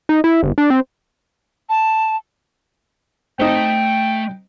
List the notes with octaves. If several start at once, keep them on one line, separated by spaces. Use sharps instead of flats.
D#4
E4
G1
D4
C4
A5
A3 C4 D#4 G5 A5